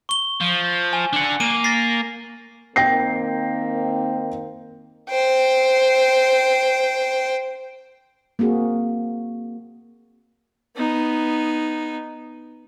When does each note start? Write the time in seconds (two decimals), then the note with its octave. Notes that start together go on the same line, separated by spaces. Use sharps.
0.09 C#6 G7
0.41 F3
0.93 G#5
1.13 D4 F#5
1.40 A#3 D#7
1.64 A6 A#6 C7
2.76 D#3 A#3 C4 G5 A#6 C7
5.09 C5 G5
8.39 A#3 C4 F#4 G#4
10.76 B3 D#4